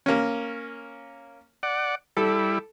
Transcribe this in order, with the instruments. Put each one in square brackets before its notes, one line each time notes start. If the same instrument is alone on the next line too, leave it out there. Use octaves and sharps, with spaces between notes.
[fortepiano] A#3 C#4
[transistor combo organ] D5 F#5
[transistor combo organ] G3 E4 [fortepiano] A4